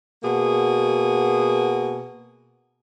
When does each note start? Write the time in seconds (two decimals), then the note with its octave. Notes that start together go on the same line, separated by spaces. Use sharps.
0.23 B2 A#3 G#4 F#5